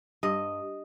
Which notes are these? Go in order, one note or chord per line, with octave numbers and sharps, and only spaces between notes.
G2 D#5